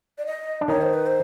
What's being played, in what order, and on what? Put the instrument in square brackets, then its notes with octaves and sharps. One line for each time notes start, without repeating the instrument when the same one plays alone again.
[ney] D5
D#5
[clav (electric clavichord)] D4
[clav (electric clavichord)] D#3 D#4 [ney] C#5
[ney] C5
B4
C5